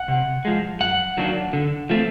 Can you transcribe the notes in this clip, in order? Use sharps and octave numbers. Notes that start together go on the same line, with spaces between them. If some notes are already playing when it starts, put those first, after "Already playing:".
Already playing: F#5
C3
F3 G#3
F#2 F#5
D#3 F#3 A#3 D4
D3
F3 A3 C4